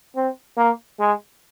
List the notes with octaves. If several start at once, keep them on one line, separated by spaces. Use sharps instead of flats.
C4
A#3
G#3